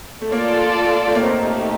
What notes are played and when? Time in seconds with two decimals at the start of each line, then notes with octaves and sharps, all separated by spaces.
0.21 A3
0.32 A#3 F4 A4 D5
1.07 A3
1.15 A#3
1.22 A3 C4 D#4 G4